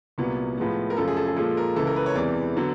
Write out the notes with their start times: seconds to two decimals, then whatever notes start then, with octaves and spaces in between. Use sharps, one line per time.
0.18 C2 A#2 F#3 B3
0.58 A2 F3 G#3 B3
0.90 A#4
0.97 F#2 C#3 F3 A3 A4
1.08 G#4
1.16 A4
1.27 G#4
1.36 A#2 F3 G#3 A4
1.57 A#4
1.76 C#2 C#3 E3 A4
1.87 A#4
1.96 B4
2.06 C#5
2.15 E2 C3 E3 G#3 D5
2.57 D3 F#3 B3